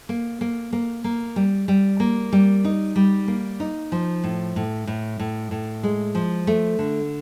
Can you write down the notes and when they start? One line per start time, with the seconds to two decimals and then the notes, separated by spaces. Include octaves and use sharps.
0.09 A#3
0.41 A#3
0.73 A#3
1.04 A#3
1.36 G3
1.68 G3
2.00 A#3
2.32 G3
2.64 D#4
2.96 G3
3.28 A#3
3.60 D#4
3.92 F3
4.24 A2
4.56 A2
4.87 A2
5.20 A2
5.51 A2
5.83 G#3
6.15 F3
6.47 A3
6.79 D3